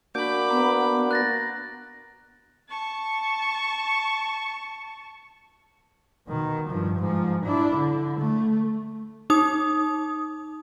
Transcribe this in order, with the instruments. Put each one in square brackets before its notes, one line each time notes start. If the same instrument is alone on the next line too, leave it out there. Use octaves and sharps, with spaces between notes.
[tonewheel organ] A#3 D4 F#4 [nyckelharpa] B5 D6 [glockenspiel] G6
[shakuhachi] B3 [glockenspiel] A#5
[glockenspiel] F#6 A6 A#6
[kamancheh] A5 C#6
[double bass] B2 D#3
G2 F3
G#2 F3
D4 E4
D3
A3
[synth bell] D#4 D#6